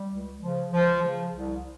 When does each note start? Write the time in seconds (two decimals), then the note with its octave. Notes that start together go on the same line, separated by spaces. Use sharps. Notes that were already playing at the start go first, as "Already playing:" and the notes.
Already playing: G3
0.11 C#2
0.41 C#3 F3
0.71 C#2 F3
1.02 C#3 F3
1.33 C2